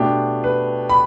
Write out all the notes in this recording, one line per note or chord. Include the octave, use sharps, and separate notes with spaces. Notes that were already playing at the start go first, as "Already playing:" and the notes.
Already playing: B2 A3 D4 G4
B4
B5